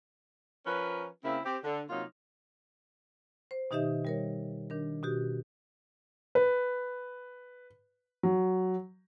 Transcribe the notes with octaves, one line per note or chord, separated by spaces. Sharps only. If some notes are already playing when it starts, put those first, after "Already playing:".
F3 C#4 A#4 B4
C#3 A#3 C4 E4
C4 G4
D3
C3 F#3 A#3 D#4 F4
C5
B2 D#3 D#4 G4 D#5 E5
G3 A#4 C#5
D#3 D4 A#4
B2 F#4 G4
B4
F#3